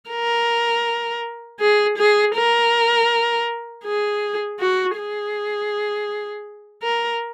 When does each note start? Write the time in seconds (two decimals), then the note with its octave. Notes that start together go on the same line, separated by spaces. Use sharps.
0.10 A#4
1.60 G#4
1.98 G#4
2.35 A#4
3.84 G#4
4.59 F#4
4.97 G#4
6.83 A#4